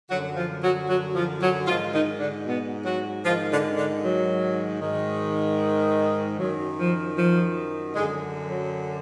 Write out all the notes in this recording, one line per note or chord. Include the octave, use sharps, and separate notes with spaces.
F#2 D3 F#3 F#4
F3 F4
F#3 F#4
F#3 F#4
F3 F4
F#3 F#4
G#2 D#3 F3 F4
D#3 D#4
D3 D4
B2 B3
F#3 F#4
G#2 D#3 F3 F4
D3 D4
D3 D4
F#3
G#2 D#3
F#2 D#3 F#3
F3
F3
F#2 G#2 D3 G#3
F#3